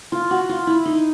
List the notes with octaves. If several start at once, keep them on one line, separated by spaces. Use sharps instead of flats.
F4
F#4
F4
E4
D#4